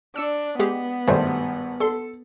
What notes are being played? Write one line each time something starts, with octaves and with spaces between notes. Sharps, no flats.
D4 E6 C#7
G#3 B3 G4 G#4
G#1 G2 B2 G3 A3 C5
A4 C6